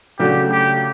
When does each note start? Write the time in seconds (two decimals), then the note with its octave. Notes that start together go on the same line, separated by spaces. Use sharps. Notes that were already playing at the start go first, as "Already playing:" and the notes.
0.19 C#3 F#3 A3 D4 F#4 G4
0.51 G4